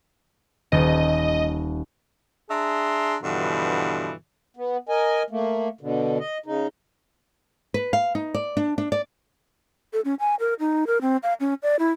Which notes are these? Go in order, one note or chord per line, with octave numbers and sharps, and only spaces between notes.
D#1 D#5 A5
D4 G#4 E5 A#5 C6
G2 B2 D3 E3 F3
B3
A#4 D#5 G#5
A3 A#3
B2 D3
D#5
C#3 D#4
B4
F5
D#4
D5
D4
D4
D5
A4
C#4
G#5
A#4
D#4
A#4
C4
F5
C#4
D5
E4